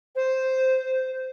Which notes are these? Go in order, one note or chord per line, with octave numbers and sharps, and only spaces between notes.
C5